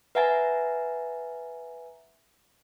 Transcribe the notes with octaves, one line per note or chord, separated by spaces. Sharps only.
B4 E5 F#5 G#5 A#5 A6